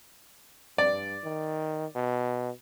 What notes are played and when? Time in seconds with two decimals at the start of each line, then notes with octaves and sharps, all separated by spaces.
0.78 G2 D5
1.24 D#3
1.96 B2